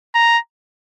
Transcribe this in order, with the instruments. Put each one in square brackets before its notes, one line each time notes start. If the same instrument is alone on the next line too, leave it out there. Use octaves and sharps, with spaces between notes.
[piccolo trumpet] A#5